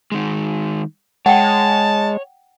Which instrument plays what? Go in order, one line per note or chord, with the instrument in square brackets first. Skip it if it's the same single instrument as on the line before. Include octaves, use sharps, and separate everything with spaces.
[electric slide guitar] D#3 G#3
[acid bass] G#3 [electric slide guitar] C#5 [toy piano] F#5 G5 [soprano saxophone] A5